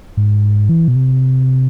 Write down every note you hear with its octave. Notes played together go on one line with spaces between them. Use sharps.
G#2
E3
B2
C3